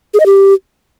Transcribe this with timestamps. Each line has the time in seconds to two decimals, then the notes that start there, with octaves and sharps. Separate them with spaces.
0.14 G#4
0.20 D#5
0.26 G4